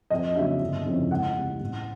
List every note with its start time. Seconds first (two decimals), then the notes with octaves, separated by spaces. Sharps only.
0.10 F2 D#5
0.36 C#3 F#3 A#3 D4 E5
0.61 G1
0.86 F2 C#3 E3
1.10 C#2 F#5
1.35 C3 E3
1.60 A1